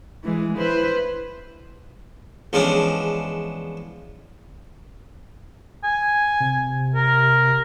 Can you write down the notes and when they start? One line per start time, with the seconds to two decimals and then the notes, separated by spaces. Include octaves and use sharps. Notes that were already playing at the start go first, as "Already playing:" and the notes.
0.24 E3 G#3
0.58 E4 B4 C5
2.53 E2 F3 G#3 C#4 D4
5.84 G#5
6.40 C3
6.95 A#4